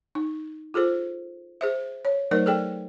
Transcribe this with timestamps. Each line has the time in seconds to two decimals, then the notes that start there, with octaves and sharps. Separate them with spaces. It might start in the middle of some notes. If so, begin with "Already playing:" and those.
0.15 D#4
0.74 F4 G#4 A4 C5
1.61 G#4 C5 E5
2.05 C#5
2.31 F#3 A3 D#4 A#4 C5 D5
2.46 G#4 A4 D5 G5